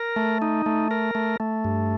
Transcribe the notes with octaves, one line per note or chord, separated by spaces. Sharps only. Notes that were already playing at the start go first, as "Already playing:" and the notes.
Already playing: A#4
A3
D#4
A3
A#4
A3
A3
G2